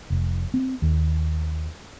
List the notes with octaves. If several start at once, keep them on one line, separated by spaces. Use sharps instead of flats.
F1
C4
D#2